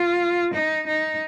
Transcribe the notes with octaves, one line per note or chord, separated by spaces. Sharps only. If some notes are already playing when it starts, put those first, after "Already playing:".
Already playing: F4
D#4
D#4